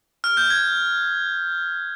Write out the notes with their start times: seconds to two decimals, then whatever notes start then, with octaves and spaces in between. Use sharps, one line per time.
0.24 F6
0.37 G6
0.50 G#6